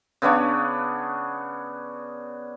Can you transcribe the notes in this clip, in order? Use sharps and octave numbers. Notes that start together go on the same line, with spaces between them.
C#3 B3 D4 C#5